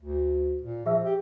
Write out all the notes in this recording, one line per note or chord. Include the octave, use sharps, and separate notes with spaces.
D2
A#2
F3 G#4 E5 E6
G4